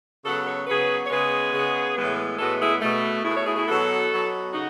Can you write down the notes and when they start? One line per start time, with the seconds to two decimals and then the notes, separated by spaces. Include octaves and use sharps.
0.24 C#3 F#3 B3 F#4 A4
0.46 A4 C#5
0.67 C#3 F#3 B3 G#4 B4
1.04 C#5
1.10 C#3 G#3 B3 G#4 B4
1.53 C#3 G#3 B3
1.96 A2 E3 G#3 B3
2.39 A2 E3 G#3 B3 F#4 A4
2.60 E4 G#4
2.81 B2 A3
3.24 B2 A3 E4 G#4
3.35 C#5 E5
3.46 E4 G#4
3.56 E4 G#4
3.67 B2 F#3 B3 F#4 A4
4.10 B2 F#3 B3
4.53 C#3 D#4 F#4